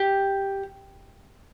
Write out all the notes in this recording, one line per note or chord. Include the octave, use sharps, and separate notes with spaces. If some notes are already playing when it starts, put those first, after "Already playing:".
Already playing: G4